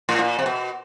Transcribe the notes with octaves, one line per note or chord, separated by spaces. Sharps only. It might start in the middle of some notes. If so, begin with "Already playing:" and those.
A2
A#2
C3
B2